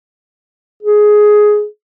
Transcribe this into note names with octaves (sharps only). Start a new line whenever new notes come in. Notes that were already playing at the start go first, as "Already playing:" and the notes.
G#4